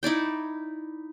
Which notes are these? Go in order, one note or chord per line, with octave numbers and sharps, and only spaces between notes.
D#4 E4 D5 G5